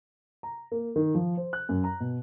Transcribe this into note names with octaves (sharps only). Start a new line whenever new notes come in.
A#5
A#3
D#3
F3
C5
F#6
F#2
A#5
B2